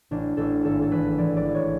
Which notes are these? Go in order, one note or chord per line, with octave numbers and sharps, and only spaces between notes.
A1 D4
A1 A4
G#1 A4
A4
E3 B4
E3 D5
D5
E3
C#5